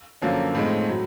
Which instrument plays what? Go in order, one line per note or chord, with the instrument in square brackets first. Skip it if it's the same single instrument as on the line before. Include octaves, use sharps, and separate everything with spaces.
[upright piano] F#2 D3 F3 A#3 C#4
A2 F3 G#3 C4 D#4
A2 F#3